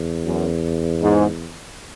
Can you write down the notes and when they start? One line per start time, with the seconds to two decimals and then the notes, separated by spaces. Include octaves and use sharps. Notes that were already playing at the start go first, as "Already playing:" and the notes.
Already playing: E2
0.24 F#2
1.02 G#2